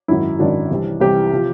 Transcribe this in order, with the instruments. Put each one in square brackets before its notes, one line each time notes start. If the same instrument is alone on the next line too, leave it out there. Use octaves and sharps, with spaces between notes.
[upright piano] G#1 F#2 D#3 F#3 E4
G#1 F#2 D#3 F#3 D4
C2 C3 E3
C2 C3 E3 G4
C3 F3